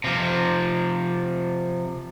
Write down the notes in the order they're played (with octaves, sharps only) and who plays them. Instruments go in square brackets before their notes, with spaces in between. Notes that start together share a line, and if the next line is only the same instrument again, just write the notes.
[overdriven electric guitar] C3 F3